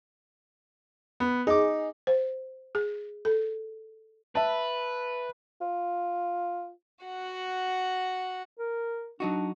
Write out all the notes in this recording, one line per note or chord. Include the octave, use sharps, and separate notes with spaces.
B3
D#4 G#4 D6
C5
G#4
A4
B4 E5 A5
F4
F#4 F#5
A#4
F#3 D4 D#4 F#4